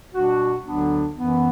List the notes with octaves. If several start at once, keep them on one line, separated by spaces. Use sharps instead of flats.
B2 G3 D4 F#4
D2 D3 F#3 B3 D4
F#2 E3 B3